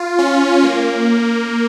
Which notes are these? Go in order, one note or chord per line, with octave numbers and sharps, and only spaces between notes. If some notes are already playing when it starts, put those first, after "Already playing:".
Already playing: F4
C#4
A#3